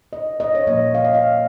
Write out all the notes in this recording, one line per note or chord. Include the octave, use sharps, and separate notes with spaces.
D#5
D#5
C#5
A#2 F3 A#3 D#5
F5
D#5
F5